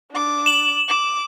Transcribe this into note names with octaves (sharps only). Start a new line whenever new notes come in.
D4 D6
E7 F#7
D6